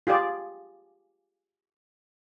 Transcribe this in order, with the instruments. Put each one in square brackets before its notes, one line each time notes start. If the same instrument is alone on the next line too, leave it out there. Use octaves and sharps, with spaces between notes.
[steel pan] F4 G4 G#4 D5